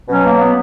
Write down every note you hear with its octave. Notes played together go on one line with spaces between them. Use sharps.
B2 F#3 C#4
A#3
B3